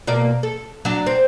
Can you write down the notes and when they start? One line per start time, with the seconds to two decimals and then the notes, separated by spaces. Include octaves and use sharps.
0.07 B2 A#3 D5
0.43 A4
0.85 F#3 D4
1.07 C4